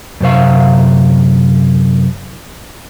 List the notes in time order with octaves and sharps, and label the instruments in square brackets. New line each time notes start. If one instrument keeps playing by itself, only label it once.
[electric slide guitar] F#2 C3 C5 F5